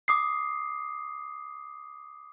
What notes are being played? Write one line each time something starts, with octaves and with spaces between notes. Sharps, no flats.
D6 D#6 C7